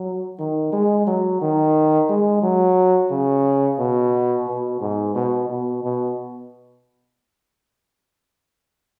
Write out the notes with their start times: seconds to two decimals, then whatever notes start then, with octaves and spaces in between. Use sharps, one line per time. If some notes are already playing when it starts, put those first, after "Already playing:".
Already playing: F#3
0.39 D#3
0.72 G#3
1.07 F#3
1.41 D#3
2.09 G#3
2.43 F#3
3.10 C#3
3.78 B2
4.47 B2
4.81 G#2
5.15 B2
5.49 B2
5.84 B2